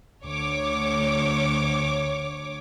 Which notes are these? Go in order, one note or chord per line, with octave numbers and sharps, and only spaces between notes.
D2 C#5 D6